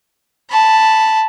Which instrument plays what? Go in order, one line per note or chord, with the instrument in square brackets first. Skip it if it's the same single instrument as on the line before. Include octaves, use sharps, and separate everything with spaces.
[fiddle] A5 B5